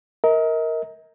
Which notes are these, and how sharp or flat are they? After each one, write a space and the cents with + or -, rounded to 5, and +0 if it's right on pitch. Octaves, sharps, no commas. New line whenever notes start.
A#4 +0 D#5 +40